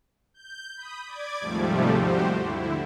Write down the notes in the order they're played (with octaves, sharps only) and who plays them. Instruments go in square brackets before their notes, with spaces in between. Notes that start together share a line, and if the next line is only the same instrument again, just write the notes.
[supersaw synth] G6
B5 D#6
D5 D6 G#6
D#2 G#2 C3 F3 G3 A3
F#4 G4 C5
D3 E4